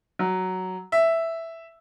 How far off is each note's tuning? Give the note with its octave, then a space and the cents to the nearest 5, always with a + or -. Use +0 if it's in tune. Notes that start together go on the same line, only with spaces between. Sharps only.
F#3 +5
E5 +0